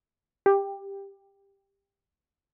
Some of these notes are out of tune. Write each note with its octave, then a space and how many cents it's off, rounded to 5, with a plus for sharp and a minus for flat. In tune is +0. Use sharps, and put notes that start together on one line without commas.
G4 +10